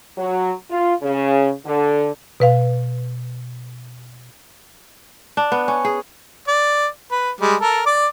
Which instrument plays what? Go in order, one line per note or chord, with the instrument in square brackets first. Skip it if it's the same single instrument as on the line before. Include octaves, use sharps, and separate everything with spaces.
[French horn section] F#3
F4
C#3
D3
[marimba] B2 B4 F5
[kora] D4
B3
C#4
G#4
[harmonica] D5
B4
G3 G#3
A4 A#4
D5 D6